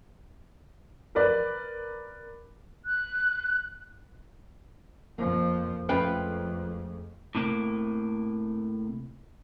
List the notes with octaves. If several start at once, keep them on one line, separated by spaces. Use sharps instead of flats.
A#4 B4 D5
F#6
F2 F3 A#3
F2 G#3 A3 C#4 F4 B4 G5
A2 C3 A#3